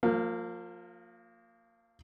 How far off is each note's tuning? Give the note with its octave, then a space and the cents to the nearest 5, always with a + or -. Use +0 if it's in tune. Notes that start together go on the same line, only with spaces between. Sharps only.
F3 +20 A#3 -25